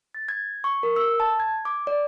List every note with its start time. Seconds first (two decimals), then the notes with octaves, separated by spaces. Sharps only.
0.15 A6
0.29 G#6
0.64 C#6
0.83 A#4
0.96 E6
1.20 A5
1.40 G#6
1.65 D6
1.87 D5